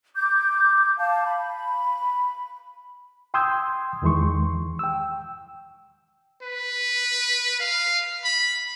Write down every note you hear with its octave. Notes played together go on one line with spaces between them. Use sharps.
D6 G6
F5 A5
B5
G5 C6 D#6 E6 G6 G#6
E2 D#3 E3 G#3 C6 C#6
G5 E6
B4
F5
B5